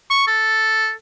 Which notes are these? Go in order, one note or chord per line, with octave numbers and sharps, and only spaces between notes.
C#6
A4